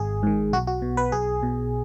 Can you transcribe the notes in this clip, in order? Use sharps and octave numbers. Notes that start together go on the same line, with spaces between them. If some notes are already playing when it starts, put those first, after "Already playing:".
Already playing: G#1 G#4
G#2 D#3
B1 F#4
F#4
B2
B4
B1 G#4
B2